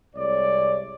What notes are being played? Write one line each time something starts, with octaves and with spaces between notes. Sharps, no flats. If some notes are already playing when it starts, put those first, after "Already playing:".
C2 C3 G#3 C#5 D5